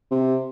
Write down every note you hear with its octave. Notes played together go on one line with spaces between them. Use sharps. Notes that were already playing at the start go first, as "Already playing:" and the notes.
C3